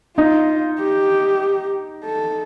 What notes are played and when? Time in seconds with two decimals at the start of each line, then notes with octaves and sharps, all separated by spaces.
0.17 D#4 F4
0.80 G4
2.05 A4